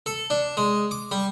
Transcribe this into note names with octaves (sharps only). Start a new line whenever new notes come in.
A4
D4
G#3
D6
G3